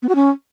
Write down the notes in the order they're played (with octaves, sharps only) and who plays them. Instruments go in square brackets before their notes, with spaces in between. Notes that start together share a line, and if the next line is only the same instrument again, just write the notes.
[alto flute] B3
F#4
C#4